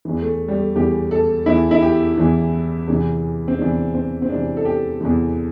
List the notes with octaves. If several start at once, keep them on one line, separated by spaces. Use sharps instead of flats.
E2 E3
A3
G3
A3
E2 E3 G4
A4
E2 E3 E4
E4
G4
E2 E3
E2 C3 E3
C4
E2 C3 E3 D4
C4
C4
E2 C3 E3 D4
A4
G4
E2 C3 E3